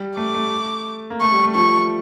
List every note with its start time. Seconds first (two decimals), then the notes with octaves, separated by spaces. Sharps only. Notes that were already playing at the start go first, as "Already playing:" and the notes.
Already playing: G3
0.17 A3 D6
0.35 A3
1.10 A#3
1.21 A3 C#6
1.32 G3
1.43 A3
1.55 F3 C#6